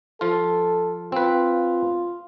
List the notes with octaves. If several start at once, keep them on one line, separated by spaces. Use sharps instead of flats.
F3 F4 A4
C4 F4 B4